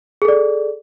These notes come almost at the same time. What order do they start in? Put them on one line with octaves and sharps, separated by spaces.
G#4 A4 D5